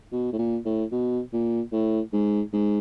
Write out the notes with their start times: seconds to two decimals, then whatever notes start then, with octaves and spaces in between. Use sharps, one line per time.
0.12 B2
0.33 A2
0.39 A#2
0.66 A2
0.92 B2
1.33 A#2
1.72 A2
2.13 G#2
2.53 G#2